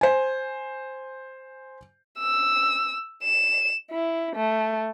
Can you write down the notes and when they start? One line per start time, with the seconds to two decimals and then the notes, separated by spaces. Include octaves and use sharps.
0.01 C5 G#5
2.19 E6
3.23 E7
3.91 E4
4.35 A3